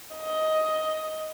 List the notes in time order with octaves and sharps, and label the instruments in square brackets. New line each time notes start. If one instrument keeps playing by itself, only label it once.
[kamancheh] D#5